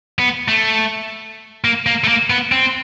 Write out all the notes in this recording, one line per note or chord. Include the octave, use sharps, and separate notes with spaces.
B3
A3
A#3
A#3
A3
A#3
B3
C4